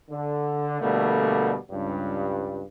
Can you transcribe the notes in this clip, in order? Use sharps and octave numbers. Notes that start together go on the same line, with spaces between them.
D3
B2 D3 G3 A3 A#3
C#2 G2